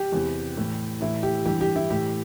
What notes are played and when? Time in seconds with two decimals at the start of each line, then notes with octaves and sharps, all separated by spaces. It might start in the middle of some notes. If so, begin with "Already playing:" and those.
Already playing: G4
0.12 E2 C3 E3
0.57 A2 E3
1.01 A2 E3 E4
1.23 G4
1.45 G2 E3 G4
1.61 G4
1.76 E4
1.90 A2 E3 G4